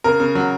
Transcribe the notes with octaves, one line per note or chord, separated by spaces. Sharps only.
C#3 A#4
C#3
F#3